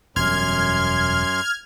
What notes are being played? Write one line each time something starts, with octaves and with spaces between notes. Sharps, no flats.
E1 F#2 G3 C6 F6 G#6